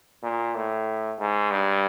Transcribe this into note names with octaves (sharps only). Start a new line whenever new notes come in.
A#2
A2
G#2
G2